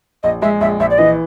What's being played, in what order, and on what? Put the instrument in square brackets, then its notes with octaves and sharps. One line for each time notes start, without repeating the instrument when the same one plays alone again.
[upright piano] A#1 [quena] D#5
[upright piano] G#3 [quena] E5
[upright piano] A#1 [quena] E5
[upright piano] A#1 [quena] E5
[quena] D5
[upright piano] E3 [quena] D#5